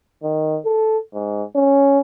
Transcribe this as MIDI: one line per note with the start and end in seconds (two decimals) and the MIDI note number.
0.23 0.58 51
0.65 0.98 69
1.14 1.43 44
1.56 2.00 61